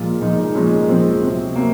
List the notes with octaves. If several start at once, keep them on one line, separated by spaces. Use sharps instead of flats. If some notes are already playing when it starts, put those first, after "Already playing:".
Already playing: A#2 F3 G#3 F4
A#2 F3 G#3 D#4
D#4
A#2 F3 G#3 C#4
A#2 F3 G#3 C4
C3 F#3
C3 F#3 A#3